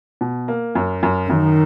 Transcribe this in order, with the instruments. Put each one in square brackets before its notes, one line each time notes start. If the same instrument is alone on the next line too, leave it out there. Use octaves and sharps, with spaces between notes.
[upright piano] B2
A#3
F#2
F#2
[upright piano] F#2 [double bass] D#3